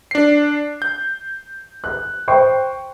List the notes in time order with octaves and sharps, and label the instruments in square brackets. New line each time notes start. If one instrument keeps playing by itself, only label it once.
[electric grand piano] D4 C7
G6
[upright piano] F#6
C5 G5 C#6